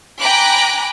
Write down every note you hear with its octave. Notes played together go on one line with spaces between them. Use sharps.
G5 G#5 A#5 B5 D6 F#6